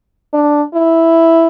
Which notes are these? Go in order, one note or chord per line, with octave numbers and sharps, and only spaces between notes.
D4
E4